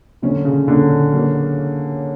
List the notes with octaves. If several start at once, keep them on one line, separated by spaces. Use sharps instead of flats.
A#2 D3 F#3 C#4
C#3
A#2 D3 F#3 C#4
F#3 A#3 C#4 F#4 C#5